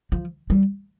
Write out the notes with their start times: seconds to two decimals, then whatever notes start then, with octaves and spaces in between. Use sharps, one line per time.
0.12 F3
0.50 G3